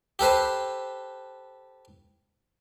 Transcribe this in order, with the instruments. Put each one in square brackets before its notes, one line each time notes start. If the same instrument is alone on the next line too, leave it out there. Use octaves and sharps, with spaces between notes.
[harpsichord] G4 A4 B4 C5